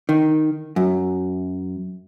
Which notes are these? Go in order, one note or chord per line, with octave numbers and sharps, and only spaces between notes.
D#3
F#2